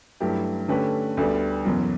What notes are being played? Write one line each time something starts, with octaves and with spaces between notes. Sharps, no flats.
G2 F#3 A3 E4 G4
D3 A3 C#4 G4 B4
D2 D3 G3 B3
F#1 E2 B2 F#3